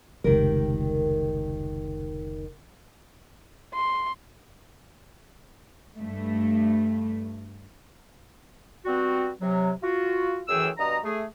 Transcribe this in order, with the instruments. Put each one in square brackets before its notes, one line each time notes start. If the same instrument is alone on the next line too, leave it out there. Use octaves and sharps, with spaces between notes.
[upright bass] F1 C#2 [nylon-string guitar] D#3 G4 A#4
[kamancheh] C6
[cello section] G2 A3
[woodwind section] G3 B3 C4 F#4
C3 F#3
F4 F#4
F#2 A2 E3 G#4 G5 E6
G2 B2 D#5 A#5
A3 G#4